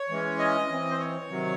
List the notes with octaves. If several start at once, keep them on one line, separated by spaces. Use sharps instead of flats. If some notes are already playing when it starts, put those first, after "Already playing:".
Already playing: C#5
E3 G#3 C#4
D#5
E3 C4
C5
C#5
C3 D#3 F#3